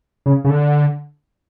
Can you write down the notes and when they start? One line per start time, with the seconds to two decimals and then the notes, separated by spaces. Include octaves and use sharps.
0.26 C#3
0.45 C#3
0.50 D3